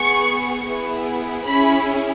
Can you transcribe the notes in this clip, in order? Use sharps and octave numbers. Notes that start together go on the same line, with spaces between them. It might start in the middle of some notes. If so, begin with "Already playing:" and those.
Already playing: B3 G#4 C#6
B3 E4 G#4
C#4 E4 G#4 B5